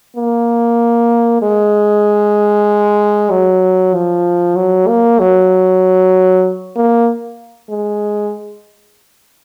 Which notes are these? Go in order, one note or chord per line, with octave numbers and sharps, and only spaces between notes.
A#3
G#3
F#3
F3
F#3
A#3
F#3
A#3
G#3